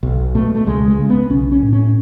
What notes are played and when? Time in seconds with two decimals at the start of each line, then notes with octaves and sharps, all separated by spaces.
0.03 B1
0.35 B2 A3
0.55 A3
0.67 C#2 G#3
0.88 G#3
0.98 C#3
1.10 B3
1.30 B1 C#4
1.52 C#4
1.62 A2
1.73 C#4